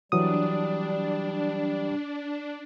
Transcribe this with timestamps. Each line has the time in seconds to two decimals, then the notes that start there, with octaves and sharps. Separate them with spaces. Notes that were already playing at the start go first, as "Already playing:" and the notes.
0.12 E3 F#3 G3 D4 D#6